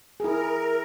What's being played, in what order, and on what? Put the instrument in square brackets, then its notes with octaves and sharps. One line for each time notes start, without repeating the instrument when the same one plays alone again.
[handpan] E4 G#4 [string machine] A#4